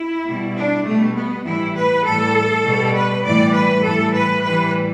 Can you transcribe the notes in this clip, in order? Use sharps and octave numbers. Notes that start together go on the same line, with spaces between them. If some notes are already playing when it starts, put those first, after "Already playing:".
Already playing: E4
B2 G3
D4
B2 G3 A3
B3
A2 E3 G3 E4
B4
A2 E3 G3 A4
B2 G3
B4
A2 E3 G3 D5
B4
A2 E3 G3 A4
B4
A2 E3 G3 B4